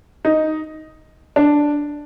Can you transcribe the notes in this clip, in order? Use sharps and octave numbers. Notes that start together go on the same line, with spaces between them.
D#4
D4